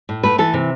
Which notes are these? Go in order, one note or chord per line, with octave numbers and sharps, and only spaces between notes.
A2
A3 B4
E3 A4
C3